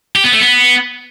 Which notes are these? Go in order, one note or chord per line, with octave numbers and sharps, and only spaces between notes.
G4
B3
A3
B3